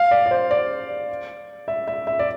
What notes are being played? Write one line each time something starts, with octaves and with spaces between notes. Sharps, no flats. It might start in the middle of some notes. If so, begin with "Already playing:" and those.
Already playing: F5
D5
D5
C5
D5
E5
E5
E5
D5